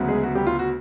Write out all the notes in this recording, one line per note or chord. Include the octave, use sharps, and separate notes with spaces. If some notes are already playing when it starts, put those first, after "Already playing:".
Already playing: D2 C#3 F#3 B3
G#3 G#4
F#4
G3 G4
F4
F#4